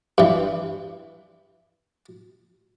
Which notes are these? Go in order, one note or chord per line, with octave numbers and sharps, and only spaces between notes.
G2 E3